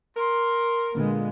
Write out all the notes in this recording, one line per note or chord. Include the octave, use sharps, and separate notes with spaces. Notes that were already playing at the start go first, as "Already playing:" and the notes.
A#4 C6
A#2 D3 G#3 A#3 B3